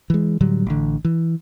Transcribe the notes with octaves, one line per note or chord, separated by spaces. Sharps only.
E3 G#3
A2 D3 F#3 G3
A1 D3
E3